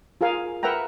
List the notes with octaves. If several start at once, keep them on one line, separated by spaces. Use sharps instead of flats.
F4 G#4 A#4 F5 G#5
A#4 B4 E5 F#5 G5 A#5